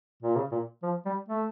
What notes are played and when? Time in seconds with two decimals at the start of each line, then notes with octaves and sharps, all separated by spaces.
0.23 A#2
0.36 C#3
0.52 A#2
0.83 F3
1.06 G3
1.29 A3